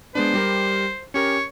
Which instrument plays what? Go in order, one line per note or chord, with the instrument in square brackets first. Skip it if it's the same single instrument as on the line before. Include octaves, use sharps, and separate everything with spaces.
[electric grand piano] G#3 B3 D4 [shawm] C5
[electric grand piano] G3 G4 A#4
[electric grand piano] C#4 G4 A#4 [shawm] C#5